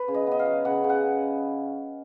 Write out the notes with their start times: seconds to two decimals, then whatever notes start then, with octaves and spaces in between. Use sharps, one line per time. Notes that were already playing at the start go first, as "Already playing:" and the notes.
Already playing: B4
0.08 C#3
0.14 D#5
0.27 B3 D#5
0.39 F5
0.46 F#3
0.65 C#3 F#5
0.84 C#3
0.90 F#5